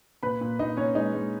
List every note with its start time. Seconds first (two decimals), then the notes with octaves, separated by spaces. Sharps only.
0.23 A#2 B4 B5
0.41 A#2
0.59 A#2 D#4 D#5
0.77 A#2 C#4 C#5
0.95 G#3 D#4 D#5
1.14 G#3